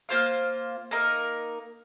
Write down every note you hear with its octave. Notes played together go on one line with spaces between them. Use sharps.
A#3 F4 C5 F5
A#3 D#4 A#4